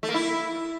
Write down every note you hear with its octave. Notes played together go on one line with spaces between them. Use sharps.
A3
A#3
E4